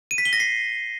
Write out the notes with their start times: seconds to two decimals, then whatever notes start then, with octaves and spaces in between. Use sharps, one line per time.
0.11 D#7
0.18 B6
0.25 G7
0.33 A#6
0.40 C7